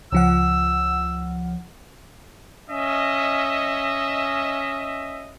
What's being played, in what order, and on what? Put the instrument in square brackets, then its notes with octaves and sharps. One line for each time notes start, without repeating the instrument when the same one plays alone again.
[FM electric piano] C#2 F3 F#5 [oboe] E6
[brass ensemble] C#4 D#5 E5